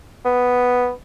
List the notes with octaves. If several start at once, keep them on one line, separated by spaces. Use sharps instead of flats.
B3